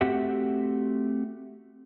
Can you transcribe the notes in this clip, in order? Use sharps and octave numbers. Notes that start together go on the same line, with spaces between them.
A3 C4 F#4 G4 E5 F#5